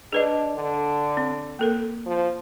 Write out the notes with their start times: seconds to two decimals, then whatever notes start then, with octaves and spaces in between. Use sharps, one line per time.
0.13 D4 G#4 B4 D#5
0.54 D3
1.17 C4
1.59 A#3 A4 A#4
2.06 F3